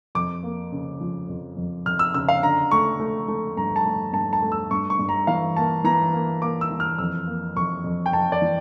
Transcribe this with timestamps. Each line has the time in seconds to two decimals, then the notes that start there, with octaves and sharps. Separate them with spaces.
0.15 F2 D6
0.43 A#3
0.72 C#3
1.01 F3
1.29 F2
1.57 F2
1.86 F2 F6
1.99 E6
2.14 C#3 E6
2.28 F5
2.42 D3 A#5
2.71 A3 C#6
3.00 A3
3.28 A3
3.57 G2 A#5
3.76 A5
3.85 A3
4.13 G2 A5
4.33 A5
4.42 A3
4.52 E6
4.71 G2 C#6
4.90 C#6
4.99 G2
5.09 A#5
5.27 E3 F5
5.57 A#3 A5
5.84 E3 A#5
6.13 A#3
6.42 A#3 D6
6.61 E6
6.71 E3
6.80 F6
6.98 F2 E6
7.27 A#3
7.56 F2 C#6
7.84 F2
8.06 G5
8.13 F2 A5
8.32 D5
8.42 E3